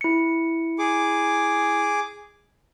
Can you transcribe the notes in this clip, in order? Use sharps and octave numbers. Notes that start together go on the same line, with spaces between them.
E4 C#7
G#4 D6